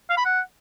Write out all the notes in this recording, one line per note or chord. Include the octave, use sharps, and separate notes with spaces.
F5
B5
F#5